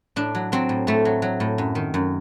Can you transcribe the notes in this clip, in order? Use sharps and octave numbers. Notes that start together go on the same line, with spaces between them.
A2 D4
F#3
F#3 C4
A2
A2 A3
F#3
F#3
A2
F#2
D#3
F#2